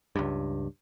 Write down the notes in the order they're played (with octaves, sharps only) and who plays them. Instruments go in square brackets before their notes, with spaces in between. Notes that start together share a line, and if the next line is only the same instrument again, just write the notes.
[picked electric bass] C#2 G2